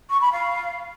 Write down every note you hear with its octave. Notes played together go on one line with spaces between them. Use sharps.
C#6
B5
F5